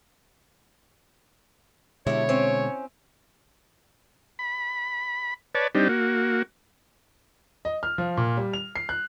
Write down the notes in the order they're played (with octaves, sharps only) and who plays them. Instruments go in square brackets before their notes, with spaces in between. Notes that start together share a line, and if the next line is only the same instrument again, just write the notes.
[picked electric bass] B2 D3 G#3 [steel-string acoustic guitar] E4 G4 A4 [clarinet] C#5
[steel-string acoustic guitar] C4 C#4
[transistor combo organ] B5
B4 C#5 D5 A5
G3 C4 D4 D#4 G4
A#3 F#4
[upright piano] D#5
F6
F3
A#2
G3
F7
C7
F#6